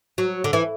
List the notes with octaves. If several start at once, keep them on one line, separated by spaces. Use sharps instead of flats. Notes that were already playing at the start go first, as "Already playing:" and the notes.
F#3
D3
E3